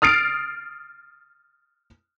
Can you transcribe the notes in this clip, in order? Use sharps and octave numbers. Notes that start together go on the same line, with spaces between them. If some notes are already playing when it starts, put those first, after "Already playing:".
D#6 F6 A6 C7 D7